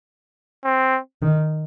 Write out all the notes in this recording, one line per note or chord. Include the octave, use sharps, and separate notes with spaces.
C4
D#3